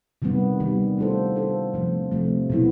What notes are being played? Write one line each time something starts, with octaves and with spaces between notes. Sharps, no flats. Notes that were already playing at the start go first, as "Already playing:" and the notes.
C3 D#3 G3 B3
C3 D#3 G3 B3
A3 D4 F4 A4 C5
A3 D4 F4 A4 C5
C3 F3 A3
C3 F3 A3
B2 F#3 B3 E4